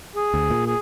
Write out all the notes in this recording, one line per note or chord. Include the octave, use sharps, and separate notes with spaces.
G#4
D2
A#2
G#4